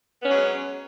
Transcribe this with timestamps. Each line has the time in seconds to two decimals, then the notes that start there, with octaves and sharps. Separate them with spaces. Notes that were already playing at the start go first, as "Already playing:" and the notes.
0.22 B3
0.26 C#4
0.29 F#3
0.33 G#3